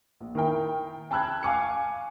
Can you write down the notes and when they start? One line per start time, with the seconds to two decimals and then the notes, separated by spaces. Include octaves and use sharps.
0.21 A#1
0.35 D#3 E4 A#4 G5
1.11 G5 A5 B5 E6 F#6 G#6
1.43 F5 G#5 D6 C#7